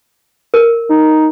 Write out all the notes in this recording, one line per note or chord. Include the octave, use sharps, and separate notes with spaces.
A#4
D#4